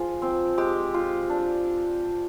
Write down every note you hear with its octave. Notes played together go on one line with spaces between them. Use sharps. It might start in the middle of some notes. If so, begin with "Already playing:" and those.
Already playing: F3 F4 G#4
C4
G#3 G4
F4
D4